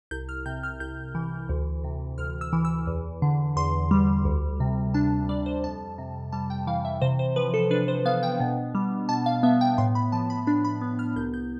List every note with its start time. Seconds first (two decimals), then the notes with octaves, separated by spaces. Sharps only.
0.11 C2 G6
0.29 F6
0.46 C3 G6
0.63 F6
0.80 C2 G6
1.15 E3
1.49 D2
1.84 C3
2.18 D2 F6
2.41 E6
2.53 E3
2.65 E6
2.87 E2
3.22 D3
3.56 E2 C6
3.91 G3
4.25 D2
4.60 C3
4.94 D4 A5
5.29 G3 D5
5.46 C5
5.64 F2 A5
5.98 C3
6.33 G3 A5
6.50 G5
6.67 E3 F5
6.85 E5
7.02 C3 C5
7.19 C5
7.36 F3 B4
7.54 A4
7.71 D4 B4
7.88 C5
8.05 B3 F5
8.23 G5
8.40 B2
8.75 G3
9.09 B2 A5
9.26 F5
9.43 B3 E5
9.61 G5
9.78 A2 C6
9.95 B5
10.12 F3 A5
10.30 B5
10.47 D4 B5
10.64 B5
10.81 B3
10.99 F6
11.16 C2 G6
11.34 G6